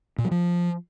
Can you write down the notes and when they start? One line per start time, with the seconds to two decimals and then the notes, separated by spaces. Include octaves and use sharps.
0.18 A#2
0.25 F#3
0.31 F3